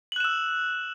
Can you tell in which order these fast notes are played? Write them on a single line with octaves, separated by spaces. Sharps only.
F#7 F#6 E7 E6